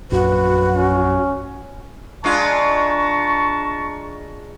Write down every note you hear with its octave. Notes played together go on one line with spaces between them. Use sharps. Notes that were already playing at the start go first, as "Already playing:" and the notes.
A#1 F#2 F#4 B4
C#4
G#3 D4 F4 A5 A#5 C#6